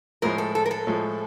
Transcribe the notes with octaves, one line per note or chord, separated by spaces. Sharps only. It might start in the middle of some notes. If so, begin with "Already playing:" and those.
A2 F3 G#3 A#4
A4
A4
A#4
A4
A2 F3 G#3